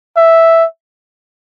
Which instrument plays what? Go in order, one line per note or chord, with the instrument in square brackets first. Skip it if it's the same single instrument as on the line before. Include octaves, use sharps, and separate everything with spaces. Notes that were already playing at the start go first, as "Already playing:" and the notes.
[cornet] E5